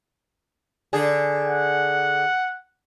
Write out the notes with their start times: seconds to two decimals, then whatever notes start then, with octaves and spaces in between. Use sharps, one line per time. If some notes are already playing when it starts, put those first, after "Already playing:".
0.93 D3 G#4
1.47 F#5